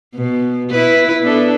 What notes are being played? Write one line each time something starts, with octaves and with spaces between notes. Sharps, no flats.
B2
E4 B4
B3 D4 A4